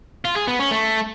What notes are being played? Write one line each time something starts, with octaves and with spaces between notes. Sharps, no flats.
F4
G#4
B3
C#4
A3